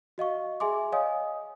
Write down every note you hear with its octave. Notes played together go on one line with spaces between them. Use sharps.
F#4 D#5 F5 C#6
G#4 E5 G#5 C6 D6
C#5 D#5 F5 G#5 D#6